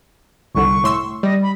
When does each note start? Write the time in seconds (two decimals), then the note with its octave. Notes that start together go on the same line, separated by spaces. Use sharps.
0.55 G1 C2 D3 C#6
0.84 A2 C6 E6
1.23 G3 D#5
1.42 B5